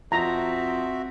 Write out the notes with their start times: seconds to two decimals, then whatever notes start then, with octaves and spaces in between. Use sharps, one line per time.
0.12 F2 C4 F4 F#4 E5 A#5